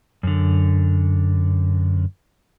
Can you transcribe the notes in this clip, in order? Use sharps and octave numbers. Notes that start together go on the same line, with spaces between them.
F#2 D3